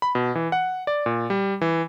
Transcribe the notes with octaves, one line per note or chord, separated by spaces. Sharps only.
B5
B2
E3
F#5
D5
A#2
G3
E3